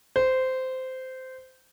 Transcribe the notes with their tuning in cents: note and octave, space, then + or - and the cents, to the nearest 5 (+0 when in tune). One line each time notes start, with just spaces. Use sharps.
C5 -15